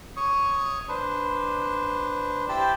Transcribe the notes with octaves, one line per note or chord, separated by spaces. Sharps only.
C#5 C#6 D#6
D4 B4 C5
E4 G4 C5 G5 A5 B5